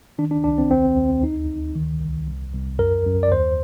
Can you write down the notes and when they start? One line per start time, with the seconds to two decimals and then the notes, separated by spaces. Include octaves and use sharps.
0.18 D#3 D4
0.31 D4
0.44 C2 D4
0.58 C4
0.71 D#2 C4
0.96 D#2
1.22 D2 D#4
1.48 D2
1.76 D#3
2.01 C2
2.27 C2
2.53 C2
2.79 F#2 A#4
3.05 F#2
3.23 D5
3.32 D#2 C5